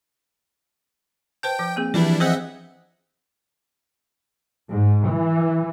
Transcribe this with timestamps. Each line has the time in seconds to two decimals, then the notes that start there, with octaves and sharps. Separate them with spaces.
1.43 B4 C5 G5 A5
1.59 F3
1.76 A#3 C4 G#4
1.94 E3 F3 G3 D4 E4 B4 D5
2.20 C4 G#4 C5 D#5 E5 F#5
4.69 G#2
5.08 E3